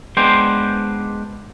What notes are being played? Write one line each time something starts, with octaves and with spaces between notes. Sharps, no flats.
G#3 B3 D4 C5 G5 C6